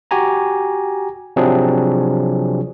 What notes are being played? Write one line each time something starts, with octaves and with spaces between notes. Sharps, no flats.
F#4 G4 G#5 A#5
C3 F3 F#3 C4 D4 G#4